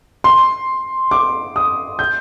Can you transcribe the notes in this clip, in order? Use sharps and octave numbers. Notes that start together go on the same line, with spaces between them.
C6
D6
D#6
G6